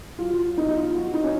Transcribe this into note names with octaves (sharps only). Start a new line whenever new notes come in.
F#3 F4
B2 D#4
F4
F#3 F#4
D#4
C#4